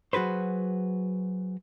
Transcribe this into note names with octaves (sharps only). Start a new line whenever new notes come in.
F#3 F#4 G#4 B4 C5